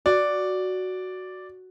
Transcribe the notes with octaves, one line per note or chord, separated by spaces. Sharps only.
F#4 D5